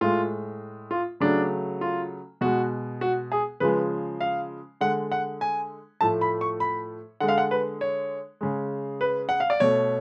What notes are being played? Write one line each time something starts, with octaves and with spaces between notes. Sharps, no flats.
A2 G#3 F4
F4
C#3 F#3 A3 D4
F4
B2 G#3 F#4
F#4
G#4
C#3 F3 G#3 B4
F5
D3 G#3 F#5
F#5
G#5
A2 F3 A3 A5
B5
C#6
B5
D3 G#3 F#5
F5
F#5
B4
C#5
C#3 G#3
B4
F#5
F5
D5
B2 A3 C#5